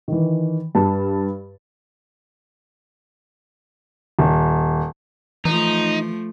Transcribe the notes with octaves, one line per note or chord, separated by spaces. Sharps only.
D#3 E3
G2 A5
D#1
E3 F3 A3 D#4